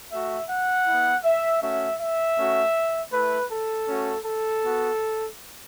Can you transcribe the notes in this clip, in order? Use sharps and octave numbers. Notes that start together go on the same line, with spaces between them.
A3 F#4 E5
F#5
B3 E4
E5
A3 C#4 F#4 E5
E5
A3 C#4 F#4
A3 E4 B4
A4
A3 C#4 F#4
A4
B3 F#4